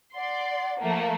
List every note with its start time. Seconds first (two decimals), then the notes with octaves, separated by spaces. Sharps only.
0.15 D5 F#5 C6
0.80 F3 A3 A#3